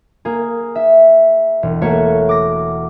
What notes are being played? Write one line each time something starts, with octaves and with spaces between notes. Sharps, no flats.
A#3 G#4
E5
E1
A3 A#3 F#4 C#5
D6 A#6